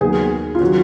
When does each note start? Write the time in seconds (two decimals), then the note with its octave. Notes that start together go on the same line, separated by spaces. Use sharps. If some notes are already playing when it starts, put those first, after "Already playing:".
0.01 D#2 D#3 F#3 B3 G#4
0.55 F4
0.60 D#3 F#3 C#4 F#4